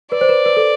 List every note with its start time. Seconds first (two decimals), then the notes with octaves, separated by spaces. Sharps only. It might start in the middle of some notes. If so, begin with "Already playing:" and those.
0.12 B4 D5
0.21 C5
0.29 B4
0.46 B4
0.57 A4